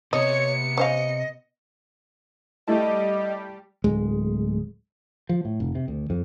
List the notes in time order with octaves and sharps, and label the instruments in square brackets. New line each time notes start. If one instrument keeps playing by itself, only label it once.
[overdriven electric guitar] C3 [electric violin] B3 C#7 [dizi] C#5 [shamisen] D#5
[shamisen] C#4 C5 F5 [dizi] D#5
[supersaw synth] G3 G4 [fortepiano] A3 E4 A5 [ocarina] D#5
[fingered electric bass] D1 G#3
F3
A2
F1
C3
D2
F2